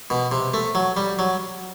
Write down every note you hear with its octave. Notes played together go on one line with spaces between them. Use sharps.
B2
C3
A3
F#3
G3
F#3